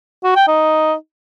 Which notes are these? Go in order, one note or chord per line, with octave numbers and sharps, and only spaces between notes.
F#4
G5
D#4